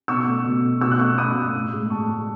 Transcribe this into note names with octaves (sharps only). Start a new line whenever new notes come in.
B2 C#6 E6
A3
B2
A3
B2 C#6 E6
F#6
A3 C#6 E6
B2 B5 D#6
A3
A2
G#3
A2 A5 C#6
G#3